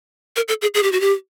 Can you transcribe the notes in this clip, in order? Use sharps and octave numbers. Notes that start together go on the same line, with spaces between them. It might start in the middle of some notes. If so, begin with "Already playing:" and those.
A#4
A4
G#4
G#4
G4
F#4
G4